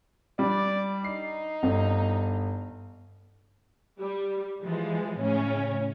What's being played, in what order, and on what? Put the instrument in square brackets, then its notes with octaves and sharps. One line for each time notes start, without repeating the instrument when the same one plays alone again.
[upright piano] G3 D4 [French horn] D5
[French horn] D#4 [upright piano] C7
[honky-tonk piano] G1
[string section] G3
E3 F3 G#3
A2 C#3 C#4